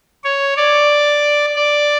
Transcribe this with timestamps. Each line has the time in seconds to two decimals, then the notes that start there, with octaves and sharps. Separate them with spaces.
0.24 C#5
0.57 D5
1.56 D5